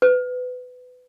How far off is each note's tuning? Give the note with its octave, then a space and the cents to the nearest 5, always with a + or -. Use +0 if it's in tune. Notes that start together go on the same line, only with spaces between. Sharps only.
B4 +20